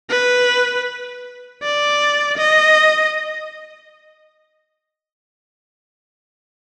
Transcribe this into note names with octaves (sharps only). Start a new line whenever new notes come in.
B4
D5
D#5